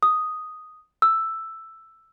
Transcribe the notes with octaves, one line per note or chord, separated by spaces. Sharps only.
D#6
E6